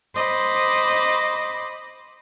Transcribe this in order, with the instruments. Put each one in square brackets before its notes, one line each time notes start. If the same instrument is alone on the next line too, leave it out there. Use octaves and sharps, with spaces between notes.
[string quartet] C5 D#5 B5 D6